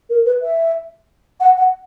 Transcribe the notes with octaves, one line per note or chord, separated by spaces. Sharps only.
A#4
B4
E5
F#5
F#5